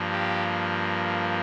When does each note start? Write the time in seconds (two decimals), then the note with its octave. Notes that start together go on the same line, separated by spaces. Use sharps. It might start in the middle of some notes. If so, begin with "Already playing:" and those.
Already playing: G2 F3 A#3
0.12 G4